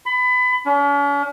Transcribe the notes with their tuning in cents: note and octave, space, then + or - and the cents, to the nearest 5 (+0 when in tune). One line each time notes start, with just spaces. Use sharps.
B5 +25
C#4 +45